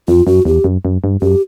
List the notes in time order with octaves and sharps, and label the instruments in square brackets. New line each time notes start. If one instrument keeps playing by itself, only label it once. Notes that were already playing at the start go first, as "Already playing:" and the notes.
[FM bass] F2 [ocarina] F4
[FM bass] F#2 [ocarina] F#4
[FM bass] E2 [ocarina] G4
[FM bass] F#2
F#2
G2
[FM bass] F#2 [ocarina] G4